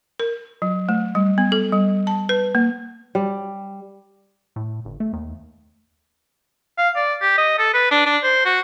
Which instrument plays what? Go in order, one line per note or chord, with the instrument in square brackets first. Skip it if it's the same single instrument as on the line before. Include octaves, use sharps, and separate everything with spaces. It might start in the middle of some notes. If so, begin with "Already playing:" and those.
[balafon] A#4
F#3
A3
G3
B3
A4
G3
A5
B4
A#3
[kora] G3
[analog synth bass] A2
G1
A3
D#2
[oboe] F5
D5
G4
D#5
A4
B4
D4
D4
C5
F#4